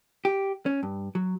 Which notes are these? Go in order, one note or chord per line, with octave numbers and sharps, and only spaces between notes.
G4
C#4
G2
F#3